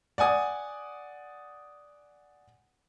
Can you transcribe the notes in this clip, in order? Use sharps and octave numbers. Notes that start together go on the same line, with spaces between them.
D5 F#5 G#5 D#6